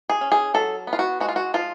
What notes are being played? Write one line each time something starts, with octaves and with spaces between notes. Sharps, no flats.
G#4
C#4
G#4
F#3 A4
B3
F4
F#4
G#3 F#4
F4
F#4
F3 F4